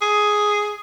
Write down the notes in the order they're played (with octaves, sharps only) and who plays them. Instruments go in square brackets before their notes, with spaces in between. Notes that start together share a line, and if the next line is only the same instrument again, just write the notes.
[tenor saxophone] G#4